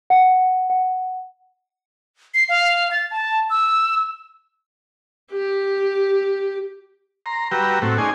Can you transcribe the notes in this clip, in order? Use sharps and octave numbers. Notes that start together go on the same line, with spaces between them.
F#5
F#5
C7
F5
A6
A5
E6
G4
A#5 C6
G3 F#4 B4 G5 A#5 E6
A2 A3 C4 F#4
C#4 D#4 G#4 D5 G#5 C6